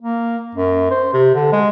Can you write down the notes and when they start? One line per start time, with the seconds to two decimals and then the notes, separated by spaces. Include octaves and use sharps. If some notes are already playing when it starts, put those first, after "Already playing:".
0.02 A#3
0.55 F#2
0.91 C5
1.13 C3
1.35 D3
1.52 G#3